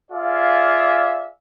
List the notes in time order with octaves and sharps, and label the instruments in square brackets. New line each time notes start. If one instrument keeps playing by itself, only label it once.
[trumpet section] F4 G#4 D5 E5 F5